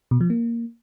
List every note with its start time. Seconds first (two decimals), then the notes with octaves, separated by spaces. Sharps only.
0.11 B2
0.21 F3
0.30 A#3